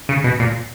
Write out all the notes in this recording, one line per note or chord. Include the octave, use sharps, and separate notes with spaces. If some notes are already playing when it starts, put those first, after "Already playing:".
C#3
B2
A#2